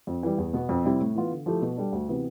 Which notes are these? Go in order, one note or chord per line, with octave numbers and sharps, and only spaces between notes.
F2
E3 G3
E2
B2 B3
F2
C3 G3 C4 E4
A2
E3 B3 F4
D3
F3 A3 E4 G4
B2
G3 D4 A4
D2
C3 E3 B3